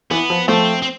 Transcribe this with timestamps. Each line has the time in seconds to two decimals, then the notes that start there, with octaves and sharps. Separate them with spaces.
0.11 E3 B3
0.30 F3
0.48 F3 A3 C4
0.82 C4